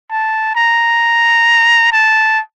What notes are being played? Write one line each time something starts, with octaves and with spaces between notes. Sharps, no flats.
A5
A#5
A5